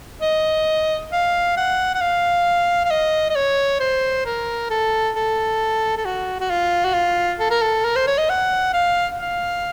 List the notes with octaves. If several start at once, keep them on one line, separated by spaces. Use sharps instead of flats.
D#5
F5
F#5
F#5
F5
F5
D#5
D#5
C#5
C5
A#4
A4
A4
A4
F#4
F#4
F4
F#4
F4
A4
A#4
A4
A#4
C5
C#5
D#5
F#5
F5
F5